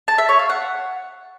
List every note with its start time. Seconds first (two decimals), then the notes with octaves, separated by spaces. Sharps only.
0.08 A5
0.18 E5
0.29 C#5
0.39 F5
0.50 F#5